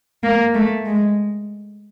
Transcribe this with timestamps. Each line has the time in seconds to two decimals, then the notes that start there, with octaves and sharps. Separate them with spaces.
0.23 A#3
0.54 A3
0.85 G#3